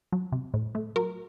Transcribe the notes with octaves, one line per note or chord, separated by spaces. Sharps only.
F#3
C3
A2
A3
F#3 A#4